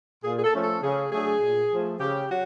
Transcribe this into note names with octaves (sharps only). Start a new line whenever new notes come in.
A#2 G#4
G#4
A4
F3 A3 C#4
A4
C#3 G#4
F#3 A3 D4 G#4
A#2
F3 A3
C#3 G4
F#3 F#4